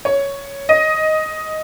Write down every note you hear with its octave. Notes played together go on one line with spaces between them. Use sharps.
C#5
D#5